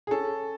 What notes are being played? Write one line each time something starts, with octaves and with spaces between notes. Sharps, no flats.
G#4
C#4 A4